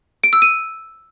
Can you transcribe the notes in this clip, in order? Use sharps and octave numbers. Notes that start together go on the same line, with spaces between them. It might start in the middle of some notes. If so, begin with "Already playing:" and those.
D7
E6
D#7